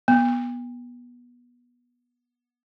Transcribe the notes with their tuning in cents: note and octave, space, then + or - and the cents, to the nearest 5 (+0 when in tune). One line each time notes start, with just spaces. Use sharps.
B3 -20